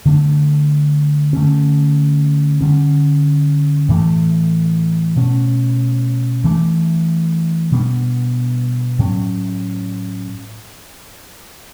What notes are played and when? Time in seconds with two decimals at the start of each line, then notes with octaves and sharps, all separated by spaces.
0.06 D3 A3 D4
1.33 D3 A3 C#4
2.61 D3 G3 C#4
3.89 A2 E3 A3
5.17 B2 A3 C#4
6.44 E3 A3 D4
7.72 B2 G3 B3 D4
8.99 A2 F#3 C#4